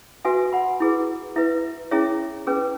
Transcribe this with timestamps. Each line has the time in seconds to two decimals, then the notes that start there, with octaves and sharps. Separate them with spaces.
0.25 F#4 B4 E5 G#5
0.53 F#5 B5
0.80 E4 G#4 B4
1.36 E4 B4 E5
1.91 C#4 E4 G#4 C#5 E5
2.47 C#4 G#4 B4